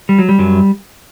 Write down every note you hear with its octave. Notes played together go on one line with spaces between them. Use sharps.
G3
F#3
G3
F#2 F#3